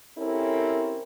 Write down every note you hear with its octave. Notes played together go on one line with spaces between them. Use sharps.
C4 C#4 E4 G4 A4 A#4